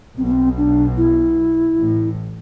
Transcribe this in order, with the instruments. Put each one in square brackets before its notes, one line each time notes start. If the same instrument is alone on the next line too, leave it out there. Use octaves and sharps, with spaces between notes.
[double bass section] B1 B2 [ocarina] C4
[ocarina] B3
C4
D4
E4
[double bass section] A1 A2